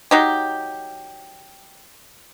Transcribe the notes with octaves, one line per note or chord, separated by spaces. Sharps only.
F#3 D#4 G4